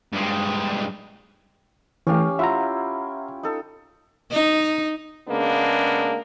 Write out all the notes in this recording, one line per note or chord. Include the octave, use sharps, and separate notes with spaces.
G2 G#3
E3 A3 C#4 G4 F5
E4 F4 E5 F#5 A#5
D#4 A4
D#4
C#3 G#3 A#3 B3 D4